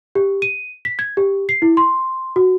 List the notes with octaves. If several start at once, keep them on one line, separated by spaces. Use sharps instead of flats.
G4
D#7
B6
G#6
G4
C7
E4
C6
F#4